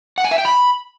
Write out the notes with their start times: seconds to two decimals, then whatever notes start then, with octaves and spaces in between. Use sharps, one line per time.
0.18 F#5
0.25 G#5
0.31 E5
0.38 G5
0.45 B5